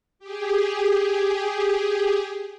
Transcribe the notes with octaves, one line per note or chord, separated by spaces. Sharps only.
G4 G#4